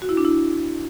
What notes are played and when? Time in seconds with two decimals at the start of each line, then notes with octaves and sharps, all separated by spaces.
0.02 F#4
0.09 E4
0.17 D4
0.25 E4